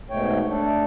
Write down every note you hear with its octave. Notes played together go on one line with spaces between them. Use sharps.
G#2 B2 A3 C#5 G5
A3 D4 A4